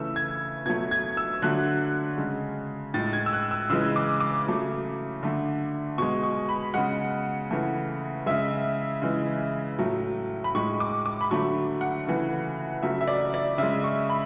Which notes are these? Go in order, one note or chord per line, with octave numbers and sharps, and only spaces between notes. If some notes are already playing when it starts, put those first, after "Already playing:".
Already playing: C#3 E3 A3 E6
G#6
B2 F#3 A3 G#6
G#6
E6
D3 F#3 A3 F#6
C#3 G#3
A2 G#3 A6
G#6
E6
F#6
E6
C#3 E3 G#3 E6
D6
D6
C#3 F#3 A3
D3 A3
B2 G#3 C#6
C#6
B5
C#3 G#3 F#5
C#3 E3 A3
C#3 G#3 E5
C#3 E3 G#3
A2 F#3 A3
B5
A2 G#3 C#6
D6
D6
B5
D3 F#3 A3 C#6
F#5
C#3 E3 A3
C#3 F#3 A3 E5
E5
D5
D5
C#3 G#3 E5
C#6
B5